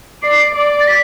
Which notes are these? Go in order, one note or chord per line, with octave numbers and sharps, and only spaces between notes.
D5 C7
D5
A6
B6